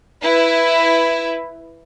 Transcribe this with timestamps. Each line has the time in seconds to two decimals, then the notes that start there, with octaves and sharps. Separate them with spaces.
0.22 E4 B4